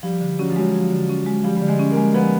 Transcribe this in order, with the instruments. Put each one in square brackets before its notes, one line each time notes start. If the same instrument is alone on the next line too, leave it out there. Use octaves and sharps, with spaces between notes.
[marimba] F3 [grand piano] G3
[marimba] D3
[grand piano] F#3 [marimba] C#4
[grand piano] F3
[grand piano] F#3 [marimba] G#3
[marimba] F3
D3
C#4
G#3
[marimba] F3 [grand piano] G3
[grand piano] G3
[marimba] D3
[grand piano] G#3
[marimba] C#4
[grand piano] A#3
[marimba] G#3
[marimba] F3 [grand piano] B3